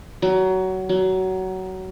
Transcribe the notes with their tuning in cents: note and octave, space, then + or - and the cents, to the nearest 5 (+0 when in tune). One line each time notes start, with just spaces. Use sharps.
F#3 +20
F#3 +20